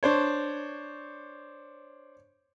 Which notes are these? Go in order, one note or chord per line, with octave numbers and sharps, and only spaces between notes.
D4 C5 C#5